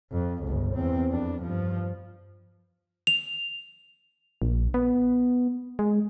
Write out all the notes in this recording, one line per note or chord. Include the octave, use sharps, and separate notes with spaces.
F2
G1 C#2
E2 C4
F2 D4
G2 F3
F7
A#1
B3
G#3